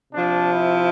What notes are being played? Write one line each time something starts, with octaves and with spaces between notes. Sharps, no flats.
C3 F3 D4
E4